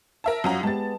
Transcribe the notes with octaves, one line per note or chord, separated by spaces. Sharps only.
A#4 E5 A5
F#2 C#4 F4 F#4 D#5 A#5
G#3 B3 G4 A5 A6